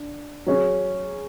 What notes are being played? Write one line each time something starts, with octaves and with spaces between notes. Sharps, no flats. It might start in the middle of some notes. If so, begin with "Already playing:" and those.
Already playing: D4
F#3 C#4 G#4